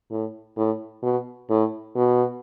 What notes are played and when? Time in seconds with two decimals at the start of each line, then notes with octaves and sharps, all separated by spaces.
0.11 A2
0.57 A2
1.03 B2
1.50 A2
1.96 B2